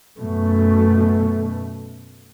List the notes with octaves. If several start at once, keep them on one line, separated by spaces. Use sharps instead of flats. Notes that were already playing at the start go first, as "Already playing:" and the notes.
F#2 B2 A3